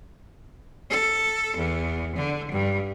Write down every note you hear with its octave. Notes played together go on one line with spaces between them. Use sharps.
A4
E2
D3
G2